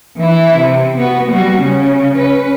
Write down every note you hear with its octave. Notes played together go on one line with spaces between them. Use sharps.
E3 E4
C3
B3 F#4
G3 F#4
C#3 C#4
C#4 B4